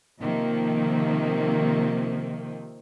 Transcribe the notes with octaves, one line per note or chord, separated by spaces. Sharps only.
C3 D#3 F3 A#3 C4